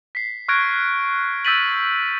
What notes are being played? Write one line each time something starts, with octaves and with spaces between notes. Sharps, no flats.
B6 C7
C#6 F6 F#6 G#6 A#6 D7
E6 G6 A6 B6 D#7 F#7